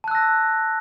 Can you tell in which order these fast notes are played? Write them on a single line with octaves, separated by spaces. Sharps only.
A5 F#6 E6 A#6